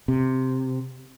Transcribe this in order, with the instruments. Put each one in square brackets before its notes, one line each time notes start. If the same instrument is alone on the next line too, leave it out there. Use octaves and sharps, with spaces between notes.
[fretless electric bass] C3